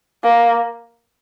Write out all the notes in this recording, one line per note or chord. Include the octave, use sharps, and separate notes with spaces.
A#3